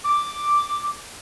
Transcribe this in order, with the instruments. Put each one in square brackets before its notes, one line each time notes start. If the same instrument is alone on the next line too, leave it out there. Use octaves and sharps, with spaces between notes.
[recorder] D6